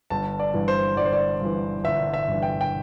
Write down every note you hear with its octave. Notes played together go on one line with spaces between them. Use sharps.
G1 A5
D5
G2 E3
C5
G1 D5
C5
D5
G2 E3
G1 E5
E5
G2 E3
G5
G5